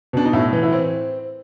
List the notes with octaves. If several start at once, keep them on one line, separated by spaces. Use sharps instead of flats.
B2 D4
D#4
A2 E4
E3
E4
C4